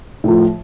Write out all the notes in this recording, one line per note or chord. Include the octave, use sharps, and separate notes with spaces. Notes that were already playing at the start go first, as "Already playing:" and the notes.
A2 F3